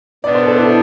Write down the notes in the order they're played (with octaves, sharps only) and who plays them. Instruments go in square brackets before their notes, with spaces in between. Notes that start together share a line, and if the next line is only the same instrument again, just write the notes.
[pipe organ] B2 B3 D4 [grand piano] D5
[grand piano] C5
A4
E4